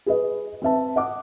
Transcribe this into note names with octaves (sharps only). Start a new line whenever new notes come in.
G#4 B4 D#5
C4 B4 E5 A5
D#5 F#5 D6